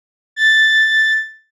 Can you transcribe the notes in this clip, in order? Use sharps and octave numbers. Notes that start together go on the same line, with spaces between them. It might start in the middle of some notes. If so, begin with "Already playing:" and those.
A6